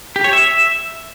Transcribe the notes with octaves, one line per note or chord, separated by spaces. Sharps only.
G4
C#5
E5